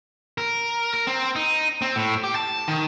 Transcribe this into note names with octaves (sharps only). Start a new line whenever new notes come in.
A#4
A#4
C4
D#4
C4
A2
G4
A5
D#3